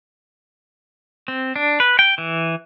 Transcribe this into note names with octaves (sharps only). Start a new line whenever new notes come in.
C4
D4
B4
G5
E3